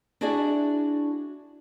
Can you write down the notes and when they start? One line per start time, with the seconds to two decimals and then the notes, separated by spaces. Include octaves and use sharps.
0.21 D4 E4 F#4 G#4 D5 E5